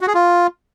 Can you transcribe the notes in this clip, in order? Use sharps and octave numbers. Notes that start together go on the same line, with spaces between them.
F#4
G#4
F4